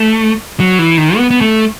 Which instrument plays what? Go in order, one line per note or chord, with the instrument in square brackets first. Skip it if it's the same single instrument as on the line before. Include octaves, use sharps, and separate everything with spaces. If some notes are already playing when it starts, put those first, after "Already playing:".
Already playing: [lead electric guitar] A3
F#3
E3
D#3
B3
B3
A3